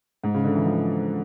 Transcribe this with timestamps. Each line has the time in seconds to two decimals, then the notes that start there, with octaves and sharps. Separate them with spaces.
0.23 G#2
0.34 C#3
0.45 D3
0.55 E3
0.66 F3